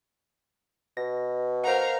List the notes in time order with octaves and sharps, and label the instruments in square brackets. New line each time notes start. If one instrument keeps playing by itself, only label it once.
[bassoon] B2 [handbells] A#6
[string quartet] A#4 F5 A#5 [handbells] C5 F#5